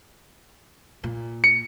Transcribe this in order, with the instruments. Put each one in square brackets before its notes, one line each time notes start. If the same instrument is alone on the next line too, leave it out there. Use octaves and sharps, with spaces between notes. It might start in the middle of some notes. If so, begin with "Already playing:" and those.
[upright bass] A#2
[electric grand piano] C#7